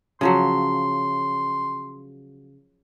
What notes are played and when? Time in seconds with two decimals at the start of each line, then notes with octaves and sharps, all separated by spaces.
0.21 C#3 F3 F#3 C6